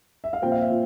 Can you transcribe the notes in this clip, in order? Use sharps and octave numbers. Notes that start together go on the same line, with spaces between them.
E5
F5
A#2 F3 C4 G5
F5
E5
A#2